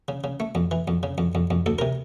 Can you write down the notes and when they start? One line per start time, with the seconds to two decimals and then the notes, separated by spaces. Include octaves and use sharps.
0.08 C#3
0.24 C#3
0.40 A3
0.55 F2
0.71 E3
0.88 F2
1.03 C#3
1.18 F2
1.35 F2
1.51 F2
1.66 D2 A4
1.79 C3 A#4